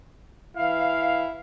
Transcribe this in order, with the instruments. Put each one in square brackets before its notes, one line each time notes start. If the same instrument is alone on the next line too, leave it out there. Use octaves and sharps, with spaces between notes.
[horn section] E3 F5 [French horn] E4